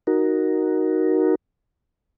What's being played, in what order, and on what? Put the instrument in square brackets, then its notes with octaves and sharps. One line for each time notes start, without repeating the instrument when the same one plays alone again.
[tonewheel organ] D#4 F#4 A#4